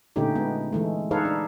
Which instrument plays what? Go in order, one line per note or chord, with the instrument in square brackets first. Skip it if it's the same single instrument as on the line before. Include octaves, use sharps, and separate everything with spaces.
[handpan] A#2 D3 A3 C#4 D#4 G4
G#3 B3
E3 G#3 A3
D#4 G#4 A4 B4 C#5 F5
D4